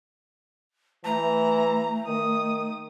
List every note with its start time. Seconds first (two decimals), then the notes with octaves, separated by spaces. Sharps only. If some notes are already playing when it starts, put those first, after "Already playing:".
1.05 E3 A3 A#5
2.07 D#3 D#6